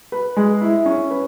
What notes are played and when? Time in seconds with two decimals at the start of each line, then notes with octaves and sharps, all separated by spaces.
0.12 B4
0.37 G#3
0.61 E4
0.86 C#4
1.10 B4